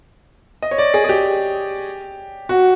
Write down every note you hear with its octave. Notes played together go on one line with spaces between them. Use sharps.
D#5
C#5
D5
G#4
G#4
G4
F#4